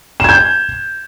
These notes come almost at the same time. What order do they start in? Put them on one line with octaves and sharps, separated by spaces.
E7 G#6 G6